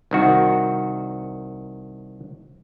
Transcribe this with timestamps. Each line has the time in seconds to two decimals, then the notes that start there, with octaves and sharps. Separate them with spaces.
0.11 C2 D#3 F#4